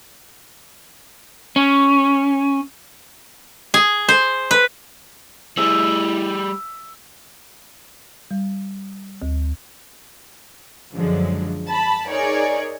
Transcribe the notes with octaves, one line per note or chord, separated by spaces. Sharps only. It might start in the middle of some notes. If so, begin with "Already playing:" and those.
C#4
G#4
C5
B4
G3 E4 G#4 E5
G3
D2
F#2 D3 F3 F#3 G#3
A5 B5
D#4 G#4 A#4 C#5 D5